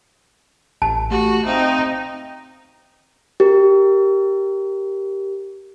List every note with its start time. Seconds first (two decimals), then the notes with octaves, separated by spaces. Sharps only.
0.82 A1 A5
1.11 A3 F#4 G4
1.45 C4 D#4 E5 F5
3.40 G4 A#4